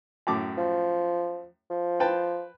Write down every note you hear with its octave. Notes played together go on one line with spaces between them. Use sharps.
F#2 A2 D6
F3
F3
B4 G5 A5